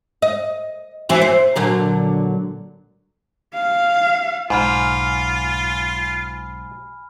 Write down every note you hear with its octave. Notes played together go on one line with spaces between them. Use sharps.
D#5
E3 C4 F#4
C5
A#2 D3 F#3
F5
B1 G#2 F4 G#5 B5 F6